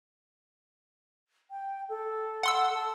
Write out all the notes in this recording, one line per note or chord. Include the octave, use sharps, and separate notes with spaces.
G5
A4
F#5 C6 E6
A5